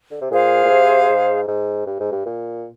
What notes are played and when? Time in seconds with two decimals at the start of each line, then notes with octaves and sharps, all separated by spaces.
0.11 D3
0.21 C3
0.30 A#2 G#4 C5 F5
0.65 A#2
0.70 C3
1.09 G#2
1.48 G#2
1.86 G2
2.00 G#2
2.12 G2
2.26 A#2